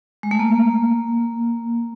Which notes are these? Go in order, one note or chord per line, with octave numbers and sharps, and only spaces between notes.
G#3
A3
A#3